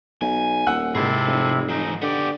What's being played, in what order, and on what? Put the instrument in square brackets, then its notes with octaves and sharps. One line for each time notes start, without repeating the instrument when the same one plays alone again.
[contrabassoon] B1 [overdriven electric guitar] G#5
[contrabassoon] D#1 [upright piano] F#5 E6 F#6
[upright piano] G#2 [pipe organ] C3 E4 [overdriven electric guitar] G#4 A4
[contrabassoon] F1
[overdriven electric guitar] E3 C5 [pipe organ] D#4
[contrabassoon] D3 [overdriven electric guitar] B3 D5 [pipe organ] G4